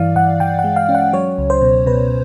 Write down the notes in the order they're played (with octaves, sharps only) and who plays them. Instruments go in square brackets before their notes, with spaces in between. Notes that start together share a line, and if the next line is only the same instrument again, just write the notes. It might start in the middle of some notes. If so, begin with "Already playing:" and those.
Already playing: [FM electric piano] G2 E3 D5 F5
G2 F#5
E3 G5
F#5
G#3
F5
C#4
F#5
F#3 C#5
C#2
C5
B2
B2 B4